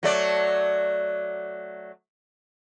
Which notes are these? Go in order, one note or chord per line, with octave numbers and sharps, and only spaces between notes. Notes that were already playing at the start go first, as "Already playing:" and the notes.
F#3 A3 D5